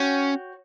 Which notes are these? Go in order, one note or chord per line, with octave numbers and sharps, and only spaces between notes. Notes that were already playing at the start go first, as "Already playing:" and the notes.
Already playing: C#4 F#4 C#5 G5